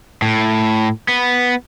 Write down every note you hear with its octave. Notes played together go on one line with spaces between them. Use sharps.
A2
B3